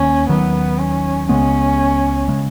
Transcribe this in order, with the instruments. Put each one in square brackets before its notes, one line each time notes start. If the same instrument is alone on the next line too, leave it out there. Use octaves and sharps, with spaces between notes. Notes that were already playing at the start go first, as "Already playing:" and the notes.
Already playing: [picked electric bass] D#2 D#3 A#3 [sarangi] C#4
[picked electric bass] D#2 D#3 F#3 [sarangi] B3
[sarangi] C#4
[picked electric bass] C#2 C#3 G#3 B3 [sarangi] C#4
[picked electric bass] C#3 G#3